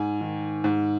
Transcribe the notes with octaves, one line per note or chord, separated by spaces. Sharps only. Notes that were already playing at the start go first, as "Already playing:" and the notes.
Already playing: G#2 G#5
D#3
G#2